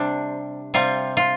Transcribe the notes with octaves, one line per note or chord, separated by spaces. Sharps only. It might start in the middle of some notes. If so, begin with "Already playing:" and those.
Already playing: C3 G3 D4
C3 G3 F4
F4